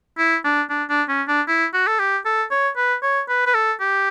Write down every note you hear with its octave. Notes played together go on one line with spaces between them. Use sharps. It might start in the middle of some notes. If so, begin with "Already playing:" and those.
E4
D4
D4
D4
C#4
D4
E4
F#4
A4
G4
A4
C#5
B4
C#5
B4
B4
A4
G4